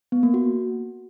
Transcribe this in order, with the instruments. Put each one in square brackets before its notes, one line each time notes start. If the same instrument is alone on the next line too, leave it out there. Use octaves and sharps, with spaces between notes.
[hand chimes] B3
A#3
F#4